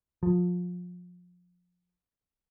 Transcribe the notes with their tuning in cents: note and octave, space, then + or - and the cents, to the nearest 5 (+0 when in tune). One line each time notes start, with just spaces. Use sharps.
F3 +30